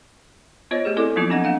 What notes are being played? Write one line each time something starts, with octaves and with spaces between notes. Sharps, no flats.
B3 F4 C5 C#5 D#5
A3 G4 G#4
C4 E4 A4 D5 D6
F3 F#3 A#3 B3 D#4 F4
B3 C4 D4 D#5 F#5
A#3 F5 F#5